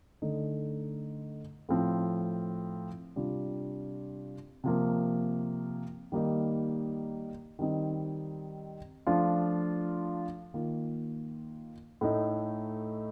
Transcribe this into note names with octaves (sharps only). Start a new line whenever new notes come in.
D3 A3 D#4
A2 F3 C4
C3 G3 D4 F4
C3 F3 A#3
D#3 G3 A#3 D#4
D#3 G3 C4 D#4
F3 A3 D4 F4
D#3 A#3 F4
A2 A3 D#4